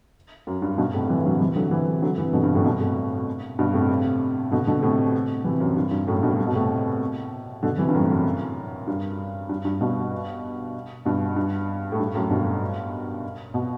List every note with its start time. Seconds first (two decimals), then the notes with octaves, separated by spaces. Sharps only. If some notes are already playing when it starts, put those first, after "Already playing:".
0.47 F#2
0.62 G2
0.78 G2 B2
0.94 A2 C3
1.08 C3 E3
1.25 D3 F#3
1.40 C3 E3
1.56 D3 F#3
1.71 C3 E3
2.02 D3 F#3
2.18 C3 E3
2.33 B2 D3
2.43 G2
2.55 F#2 A2
2.64 G2 B2
2.80 A2 C3
3.59 G2 B2
3.74 A2 C3
4.51 B2 D3
4.67 B2 D3
4.82 A2 C3
5.44 C3 E3
5.60 F#2
5.77 G2
5.91 G2
6.07 F#2 A2
6.23 G2 B2
6.39 C3
6.47 B2
6.55 A2 C3
7.63 B2 D3
7.78 C3 E3
7.89 G2
7.94 F#2 A2
8.10 F#2
8.87 G2
9.49 G2
9.65 G2
9.81 G2 B2
11.05 G2 B2
11.36 G2
11.92 A2
11.99 G2
12.14 F#2 A2
12.30 G2 B2
13.54 B2